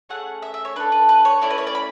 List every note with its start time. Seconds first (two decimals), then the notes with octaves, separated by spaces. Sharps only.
0.09 A3 C#4 G#4 F#5
0.42 E5
0.54 E5
0.65 C#5
0.76 D4 A4 B4
0.92 B4
1.09 B4
1.25 C#5
1.41 A3 C#4 E4 D5
1.51 B4
1.58 C#5
1.67 D5
1.75 B5